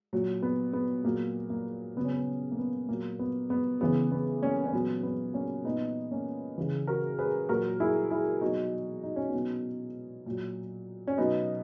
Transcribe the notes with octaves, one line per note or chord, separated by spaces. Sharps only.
A#2 F#3
B3
B3
A#2 F#3 A#3
A#3
C#3 F#3 B3
C#4
B3
A#3
B3
A#2 F#3 A#3
B3
B3
C#3 E3 B3
B3
A#3 C#4
C#4
A#2 F#3 B3
B3
A#3 C#4
A#2 F#3 B3 D#4
A#3 C#4
C#3 E3
F#4 A#4
G#4 B4
A#2 F#3 F#4 A#4
E4 G#4
E4 G#4
B2 F#3 D#4 F#4
D#4
C#4
B2 F#3 B3 D#4
A#2 F#3
C#4
B2 F#3 B3 D#4